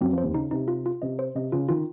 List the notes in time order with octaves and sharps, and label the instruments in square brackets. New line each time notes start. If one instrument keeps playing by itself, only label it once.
[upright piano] F#2 F#3 [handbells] C4
[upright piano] F2 F3
[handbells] C5
[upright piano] D#2 D#3
[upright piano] C#3 [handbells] D#4
[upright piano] C3 [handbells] D#4
[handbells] F4
F4
[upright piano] C3 [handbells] D#5
[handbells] C5
[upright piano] C3 [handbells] D#5
[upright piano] C#3 [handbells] F4
[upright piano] D#3 [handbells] F4